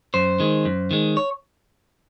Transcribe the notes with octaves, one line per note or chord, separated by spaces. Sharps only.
F#2 C5
D#3 G#3
F#2
D#3 G#3
C#5